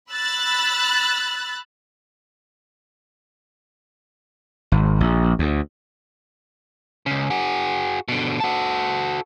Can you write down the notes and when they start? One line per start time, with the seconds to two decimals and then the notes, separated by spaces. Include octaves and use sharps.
0.11 B5 E6 F#6 A6
4.72 G#1
5.00 A#1
5.39 D2
7.06 C#2 C#3
7.30 F#4 G#4
8.08 B2 D3
8.40 F#4 A4